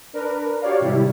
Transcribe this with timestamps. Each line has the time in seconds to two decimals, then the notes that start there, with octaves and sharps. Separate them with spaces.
0.13 D4 A#4 B4
0.62 F#4 G4 C#5 D5 F5
0.80 G#2 C3 D#3 G3 E4 G4